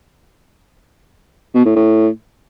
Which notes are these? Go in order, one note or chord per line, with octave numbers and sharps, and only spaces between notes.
B2
A2
A2